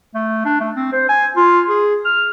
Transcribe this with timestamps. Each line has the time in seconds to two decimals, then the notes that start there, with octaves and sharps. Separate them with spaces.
0.14 A3
0.45 D4
0.60 A3
0.76 C4
0.92 C5
1.09 G#5
1.36 F4
1.68 G#4
2.05 F6